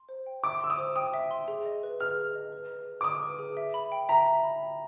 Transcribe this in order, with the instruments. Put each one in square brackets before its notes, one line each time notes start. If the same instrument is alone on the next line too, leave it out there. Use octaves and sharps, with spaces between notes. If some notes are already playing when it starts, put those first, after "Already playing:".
Already playing: [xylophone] C6
C5
G5
[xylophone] E5 [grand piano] D6
[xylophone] C6 [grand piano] E6
[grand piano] D#6
[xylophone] C5
[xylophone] G5 [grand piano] D#6
[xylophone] E5
C6
G#4
D#5
B4
[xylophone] G#4 [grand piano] F6
[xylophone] G#4
D#5
B4
G#4
G#4
[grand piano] D6
[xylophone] D#5 [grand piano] D#6
[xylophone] B4
G#4
E5
B5
G5
[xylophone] E5 [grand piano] A#5
[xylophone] E5
B5
G5